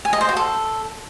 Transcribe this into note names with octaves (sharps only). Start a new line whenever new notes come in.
G#5
D#5
C5
F#4
A4